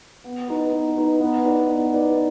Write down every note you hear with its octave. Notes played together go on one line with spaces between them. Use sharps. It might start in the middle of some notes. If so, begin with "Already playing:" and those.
B3
D#4 B4
B3
D#4 B4
B3
D#4 B4 D5
B3
D#4 B4 D5